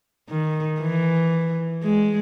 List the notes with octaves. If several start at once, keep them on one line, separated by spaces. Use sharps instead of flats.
D#3
E3
G#3